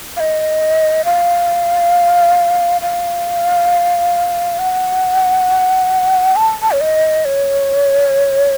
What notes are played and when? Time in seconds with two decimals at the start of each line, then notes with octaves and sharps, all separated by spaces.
0.17 F5
0.20 D#5
1.05 F5
2.82 F5
4.59 F#5
6.36 A5
6.62 A5
6.72 C#5
6.81 D#5
7.25 C#5